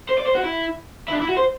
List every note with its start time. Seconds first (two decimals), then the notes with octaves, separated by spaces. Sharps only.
0.09 C5
0.18 D5
0.27 C5
0.35 F#4
0.44 E4
1.08 E4
1.12 D4
1.20 E4
1.28 F#4
1.37 C5